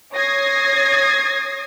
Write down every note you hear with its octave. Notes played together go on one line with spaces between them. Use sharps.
C#5 D#6 G#6 A#6 C7